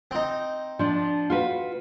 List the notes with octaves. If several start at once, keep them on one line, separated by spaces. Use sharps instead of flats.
C4 D#4
F3 D4
F4 F#4 B4